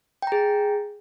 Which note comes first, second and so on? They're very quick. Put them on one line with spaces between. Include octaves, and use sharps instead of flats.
G5 A#5 G#4